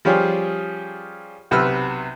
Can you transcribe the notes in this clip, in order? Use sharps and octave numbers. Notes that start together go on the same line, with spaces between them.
F3 G3 C#4 F4 G4 G#4
B1 C3 B4 E6 F6